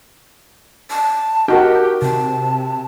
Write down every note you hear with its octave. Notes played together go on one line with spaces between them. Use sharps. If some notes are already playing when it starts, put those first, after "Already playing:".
A5
D#4 F#4 G4 A#4
C3 A5